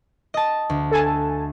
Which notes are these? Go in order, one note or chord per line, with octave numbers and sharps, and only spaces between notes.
D#5 A5
D2
A4 G#5 A5